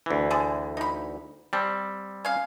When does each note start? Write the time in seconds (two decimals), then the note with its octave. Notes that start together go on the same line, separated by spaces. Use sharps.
0.06 D2 E3
0.30 D3 G#4 A4
0.77 D#4 B5
1.53 G3 C4 A5
2.25 C#4 F5